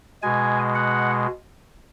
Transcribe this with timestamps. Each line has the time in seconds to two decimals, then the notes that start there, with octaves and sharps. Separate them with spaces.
0.22 B2 G#3 G#5
0.75 F#5